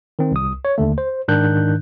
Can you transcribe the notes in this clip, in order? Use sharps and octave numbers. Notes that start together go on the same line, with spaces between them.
D#3 C4
C2 D#6
C#5
D#2 D3 A3
C5
G#2 D#3 D4 F#6 G6